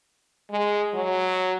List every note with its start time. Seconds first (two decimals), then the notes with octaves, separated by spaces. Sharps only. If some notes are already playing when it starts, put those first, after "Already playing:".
0.51 G#3
0.94 F#3